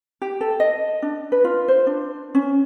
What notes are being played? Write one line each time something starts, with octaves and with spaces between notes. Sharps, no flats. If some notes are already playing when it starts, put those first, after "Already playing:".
G4
A4
D#5
D4
B4
F4
C5
D4
C#4